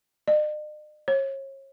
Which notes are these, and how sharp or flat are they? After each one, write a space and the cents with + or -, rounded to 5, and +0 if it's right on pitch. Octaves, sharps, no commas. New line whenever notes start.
D#5 -45
C#5 -35